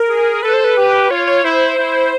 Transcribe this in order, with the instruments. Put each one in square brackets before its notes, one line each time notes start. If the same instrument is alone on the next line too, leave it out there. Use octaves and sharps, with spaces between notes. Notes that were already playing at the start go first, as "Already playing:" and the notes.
Already playing: [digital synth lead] A#4
[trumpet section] G#4
[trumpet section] A4 [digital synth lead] B4
[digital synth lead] C5
B4
[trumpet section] G4
[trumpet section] F4 [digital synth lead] C#5
[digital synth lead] C#5
[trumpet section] E4 [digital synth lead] C5
[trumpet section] E4